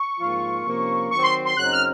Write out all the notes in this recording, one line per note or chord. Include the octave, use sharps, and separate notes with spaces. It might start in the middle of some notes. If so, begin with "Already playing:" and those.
Already playing: C#6
G#2 F3 A#3 F4
C3 F3 A#3 C#4
D#3 F#3 C4 C#6
C6
C6
F#2 C#3 F#3 C4 D#4 F#6
F6